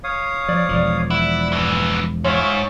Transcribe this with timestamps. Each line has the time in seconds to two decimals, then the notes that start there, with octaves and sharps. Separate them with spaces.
0.04 C#5 F5 D#6
0.48 F3 D5
0.69 E1 F3
1.10 E4 F#5
1.52 G2 E3
2.24 G#2 F4 C#5 E5 C#6